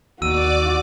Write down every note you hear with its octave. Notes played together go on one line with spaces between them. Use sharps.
D#2 F#4 D5 D6 E6 D#7